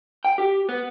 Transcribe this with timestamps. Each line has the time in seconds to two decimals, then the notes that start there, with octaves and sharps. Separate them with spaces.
0.25 G5
0.38 G4
0.69 B3